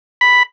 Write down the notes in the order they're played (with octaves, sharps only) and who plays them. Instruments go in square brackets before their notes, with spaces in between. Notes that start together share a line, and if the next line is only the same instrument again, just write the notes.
[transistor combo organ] B5